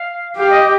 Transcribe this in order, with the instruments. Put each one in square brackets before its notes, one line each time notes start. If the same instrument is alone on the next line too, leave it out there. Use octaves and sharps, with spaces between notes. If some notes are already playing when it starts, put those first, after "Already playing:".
Already playing: [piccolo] F5
[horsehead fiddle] G4 [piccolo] F5
[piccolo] D#5